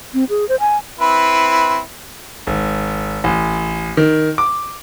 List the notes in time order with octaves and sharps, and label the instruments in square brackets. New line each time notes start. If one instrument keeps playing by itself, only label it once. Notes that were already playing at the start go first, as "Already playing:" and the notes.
[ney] C4
G#4
C5
G#5
[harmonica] C4 E4 B4
[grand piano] G#1
A1
D#3
D6